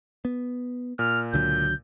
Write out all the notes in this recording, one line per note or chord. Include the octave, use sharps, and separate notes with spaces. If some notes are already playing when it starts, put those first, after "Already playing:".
B3
A#2 F6
C#2 D3 F#3 G6